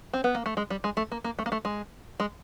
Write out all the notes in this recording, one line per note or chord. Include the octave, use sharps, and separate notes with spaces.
C4
B3
A#3
A3
G#3
G3
G#3
A3
A#3
A#3
A3
A#3
A3
G#3
G#3